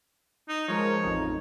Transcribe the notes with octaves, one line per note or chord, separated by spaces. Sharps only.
D#4
F3 G#3 A#4 C#5
A1 F2 D#4